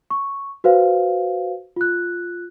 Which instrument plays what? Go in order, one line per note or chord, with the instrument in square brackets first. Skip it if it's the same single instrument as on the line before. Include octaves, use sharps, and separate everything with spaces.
[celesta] C#6
F#4 B4 C5 F5
F4 F#6